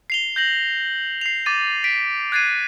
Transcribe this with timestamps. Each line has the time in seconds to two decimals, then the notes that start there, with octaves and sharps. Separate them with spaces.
0.10 C7 F7 G7
0.36 G6 A#6 F#7
1.21 C7 F7
1.46 D6 A6 D#7
1.84 B6 D7
2.32 F#6 G#6 A6 C7 D#7